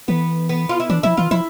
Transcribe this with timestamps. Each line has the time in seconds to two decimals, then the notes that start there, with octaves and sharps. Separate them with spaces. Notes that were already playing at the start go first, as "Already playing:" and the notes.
0.08 E3 B3
0.49 B3
0.69 F4
0.80 E4
0.90 E3 D4
1.03 F3 E4
1.17 E3 F4
1.31 F3 E4